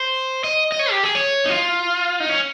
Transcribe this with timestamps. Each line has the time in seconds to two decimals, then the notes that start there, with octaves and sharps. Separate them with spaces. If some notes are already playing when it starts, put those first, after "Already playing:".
Already playing: C5
0.44 D#5
0.72 D#5
0.79 C#5
0.91 G4
1.04 G#4
1.15 C#5
1.45 D#4
1.50 F4
2.20 D#4
2.29 C#4